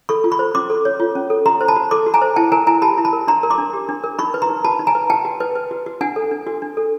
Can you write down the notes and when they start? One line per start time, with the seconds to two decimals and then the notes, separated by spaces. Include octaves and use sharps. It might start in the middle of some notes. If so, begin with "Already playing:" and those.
0.09 A4 B5 C#6
0.24 F4
0.32 B5 C#6
0.39 C5
0.54 C#4 C6 D6
0.70 A4
0.85 C#5
1.00 F4
1.15 C#4
1.30 A4
1.46 F#4 A#5 C6
1.61 C5
1.68 A5 B5
1.76 F#4
1.91 A4 C6 D6
2.06 F#4
2.14 G#5 A#5
2.22 C5
2.36 E4 G5 A5
2.52 A#4 G#5 A#5
2.67 E4 G#5 A#5
2.82 G4 A5 B5
2.98 E4
3.05 A5 B5
3.13 A#4
3.27 D4 A#5 C6
3.43 A#4
3.50 C6 D6
3.58 D4
3.73 G4
3.89 D4
4.04 A#4
4.19 D#4 B5 C#6
4.34 B4
4.42 A#5 C6
4.49 D#4
4.64 F#4 A5 B5
4.79 D#4
4.87 G#5 A#5
4.95 B4
5.10 F#4 G5 A5
5.25 F#4
5.40 B4
5.55 B4
5.71 F#4
5.86 F#4
6.01 D4 F#5 G#5
6.16 A4
6.31 D4
6.47 F#4
6.62 D4
6.77 A4